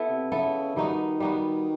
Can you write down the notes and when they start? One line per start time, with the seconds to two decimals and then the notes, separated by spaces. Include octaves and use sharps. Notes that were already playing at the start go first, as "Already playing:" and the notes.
Already playing: B3 E4 A4
0.09 C3
0.32 C#3 B3 E4 A4
0.76 D#3 G3 B3 D#4 F#4
1.20 G3 B3 D#4 F#4